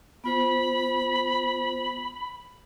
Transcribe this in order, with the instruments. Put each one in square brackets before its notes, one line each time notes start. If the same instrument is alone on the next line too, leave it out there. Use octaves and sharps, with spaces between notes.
[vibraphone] B3 F4 C5 [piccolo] B5